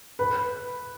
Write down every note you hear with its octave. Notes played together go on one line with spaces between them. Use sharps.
B4